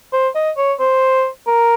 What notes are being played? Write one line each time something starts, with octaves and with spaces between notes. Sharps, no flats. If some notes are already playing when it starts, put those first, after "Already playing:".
C5
D#5
C#5
C5
A#4